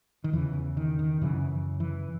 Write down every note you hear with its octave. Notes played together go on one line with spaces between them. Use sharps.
D#3
E2 C#3 E3
D#3
D#3
F#2 C#3 E3
E3